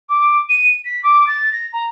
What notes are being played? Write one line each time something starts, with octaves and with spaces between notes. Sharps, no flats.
D6
D#7
B6
D6
A6
A#6
A#5